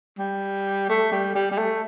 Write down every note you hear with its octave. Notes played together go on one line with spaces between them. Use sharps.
G3
A3
G3
G3
G3
A3